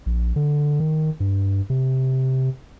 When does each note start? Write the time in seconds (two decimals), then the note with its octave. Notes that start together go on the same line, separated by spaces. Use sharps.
0.06 A#1
0.36 D3
0.80 D#3
1.20 G2
1.70 C3